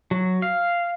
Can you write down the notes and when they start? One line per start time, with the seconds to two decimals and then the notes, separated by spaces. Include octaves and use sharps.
0.11 F#3
0.42 F5